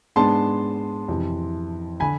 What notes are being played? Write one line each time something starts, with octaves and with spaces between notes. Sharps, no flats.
G#2 G#3 B3 D4 A5 C6
F2 C3 E3
D3 G#5 B5